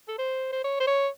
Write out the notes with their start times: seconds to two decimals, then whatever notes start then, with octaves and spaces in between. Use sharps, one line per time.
0.08 A4
0.18 C5
0.52 C5
0.64 C#5
0.80 C5
0.87 C#5